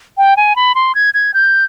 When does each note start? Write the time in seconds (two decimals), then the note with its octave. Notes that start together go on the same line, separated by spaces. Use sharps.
0.18 G5
0.37 G#5
0.56 B5
0.75 C6
0.95 G#6
1.14 G#6
1.34 G6